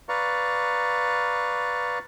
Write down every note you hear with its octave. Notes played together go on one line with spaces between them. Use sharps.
B4 D5 F5 A#5 C#6